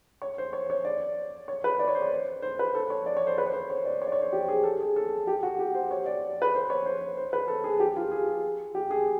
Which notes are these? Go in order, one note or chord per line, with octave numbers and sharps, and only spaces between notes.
C#5
C5
C#5
C#5
D5
C#5
B4
D5
C#5
C5
C#5
C5
B4
A4
C#5
D5
C#5
C5
B4
C#5
C5
C#5
D5
C#5
D5
C#5
C5
G4
G#4
A4
G#4
A4
G4
F#4
G4
C5
C#5
D5
B4
C5
C#5
C5
C5
B4
A4
G#4
G4
F4
G#4
G4
G#4